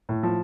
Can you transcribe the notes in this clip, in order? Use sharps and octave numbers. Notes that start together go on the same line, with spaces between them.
A2
F3